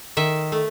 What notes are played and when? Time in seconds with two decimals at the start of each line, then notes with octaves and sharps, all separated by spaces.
0.17 D#3 E5
0.52 A3